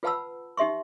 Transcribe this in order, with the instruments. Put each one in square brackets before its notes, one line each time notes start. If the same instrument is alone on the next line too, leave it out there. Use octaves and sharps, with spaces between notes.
[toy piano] F4 B4 F#5 A5 B5 E6
D#4 G4 E5 C6 C#6